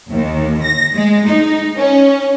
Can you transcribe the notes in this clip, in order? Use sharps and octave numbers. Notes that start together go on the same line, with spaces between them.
D#2
A#6
G#3
D#4
C#4